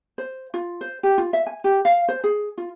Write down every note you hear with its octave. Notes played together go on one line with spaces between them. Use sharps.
C5
F4
C5
G4
F4
E5
G#5
G4
F5
C5
G#4
F4